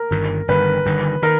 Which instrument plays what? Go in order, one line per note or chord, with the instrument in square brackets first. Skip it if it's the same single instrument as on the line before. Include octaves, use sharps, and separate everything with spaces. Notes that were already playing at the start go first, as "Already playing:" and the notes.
Already playing: [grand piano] A#4
[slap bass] G1 G2 D#3
[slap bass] G1 G2 D#3 [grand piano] B4
[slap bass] G1 G2 D#3
[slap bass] D#3 [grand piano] A#4